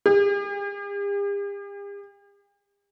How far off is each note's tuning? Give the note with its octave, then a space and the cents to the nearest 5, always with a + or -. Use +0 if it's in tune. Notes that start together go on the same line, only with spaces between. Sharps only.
G4 +45